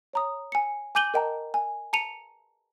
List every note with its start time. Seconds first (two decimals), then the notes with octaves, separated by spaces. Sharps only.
0.13 C#5 A#5 D#6
0.52 G#5 C#7
0.95 G#5 D6 G6 D#7 F#7 G7
1.14 A#4 D#5 G5 A5 A#5
1.54 G#5
1.93 A5 A#5 C#7 D#7 F7